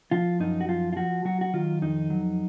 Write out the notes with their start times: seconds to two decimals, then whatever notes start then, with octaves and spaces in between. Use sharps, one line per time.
0.11 F3 F4
0.40 F#2 D#4
0.61 F#4
0.69 F3 F4
0.93 F4
0.96 F3 F#4
1.25 F#3 F#4
1.41 F#4
1.54 D#3 F4
1.82 F2 D#4
2.10 F#3